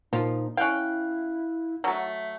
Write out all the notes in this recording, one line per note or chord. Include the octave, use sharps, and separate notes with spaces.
A#2 F3 D#4
C#4 E4 F5 G5 F#6
F#3 A3 F#5
E5